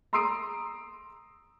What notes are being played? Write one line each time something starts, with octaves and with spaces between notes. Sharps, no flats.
A#5 C6 D#6 E6 C7 D7